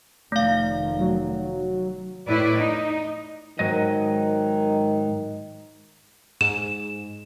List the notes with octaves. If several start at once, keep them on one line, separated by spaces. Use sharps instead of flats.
F1 D#3 A3 F5
F#3
A2 E4 B4 D5
D#4
G#2 D#3 F#3 D#5
G#2 E7